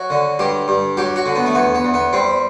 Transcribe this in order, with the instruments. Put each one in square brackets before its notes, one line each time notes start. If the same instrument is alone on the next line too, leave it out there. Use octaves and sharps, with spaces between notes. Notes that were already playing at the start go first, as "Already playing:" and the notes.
Already playing: [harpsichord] F#3 F#4
D3
G2 G4
G2
F#3 G4
F#4
D3
B3
A3
E2 B3
B3
E2
B3
G3 C4